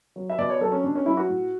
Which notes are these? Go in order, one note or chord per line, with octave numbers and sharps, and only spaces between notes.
F#3
E5
B2 D5
C#5
F#3 A4
C#4
B2 D4
C#4
F#3 E4
F#4
A2